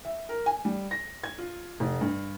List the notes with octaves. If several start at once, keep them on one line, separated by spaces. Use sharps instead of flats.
E5
A#4
G#5
G3
A#6
G#6
F4
F1
G2